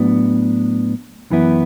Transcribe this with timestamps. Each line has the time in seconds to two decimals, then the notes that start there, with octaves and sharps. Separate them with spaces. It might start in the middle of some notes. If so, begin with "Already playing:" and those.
Already playing: A2 F#3 B3 D4
1.31 F#2 E3 B3 E4